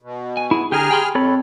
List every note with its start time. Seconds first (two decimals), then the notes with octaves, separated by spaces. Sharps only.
0.02 B2
0.37 G#5
0.51 E4 G#4
0.72 D3 G4 G#4 G#5 A#5 F6
0.91 G5 B5 C6
1.15 F2 C4 A4 C#5 B5